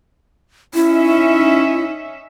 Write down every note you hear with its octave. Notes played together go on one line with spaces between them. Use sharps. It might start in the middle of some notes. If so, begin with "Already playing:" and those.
C#4 D#4 E4 E5